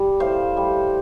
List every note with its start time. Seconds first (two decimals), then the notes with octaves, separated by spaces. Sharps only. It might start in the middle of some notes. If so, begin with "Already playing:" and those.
Already playing: G3
0.20 A2 C5 F5
0.57 G3